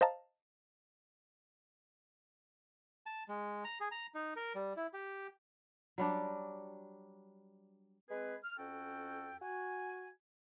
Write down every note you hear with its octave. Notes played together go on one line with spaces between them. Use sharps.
C5 D#5 F5 A5 A#5
A5
G#3
A#5
G#4
A#5
D#4
A#4
G3
E4
G4
F#3 G3 D4
G#3 C4 G#4 B4
F6
F2 C#4 F#4 A4 G5
F#4 G#5